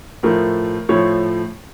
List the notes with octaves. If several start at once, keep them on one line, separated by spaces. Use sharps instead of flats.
A2 F3 A3 A#4
A2 F3 A3 C#5